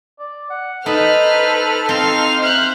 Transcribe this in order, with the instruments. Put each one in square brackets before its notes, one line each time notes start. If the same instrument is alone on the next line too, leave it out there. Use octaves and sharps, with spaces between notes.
[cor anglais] D5
F#5
[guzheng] D#4 [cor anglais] A4 [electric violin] B4 [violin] C5 F6
[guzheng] C4 [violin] D#4 F7 [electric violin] F5 C6
[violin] C5 E5 [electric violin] F6 F#6